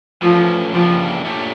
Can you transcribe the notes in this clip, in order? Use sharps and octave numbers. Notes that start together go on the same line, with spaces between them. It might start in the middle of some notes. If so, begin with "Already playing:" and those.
E3 F3 A3 C#4
C#3 E3 F3 A#3 D4 G4
A#2 A3 D4 G4 C#5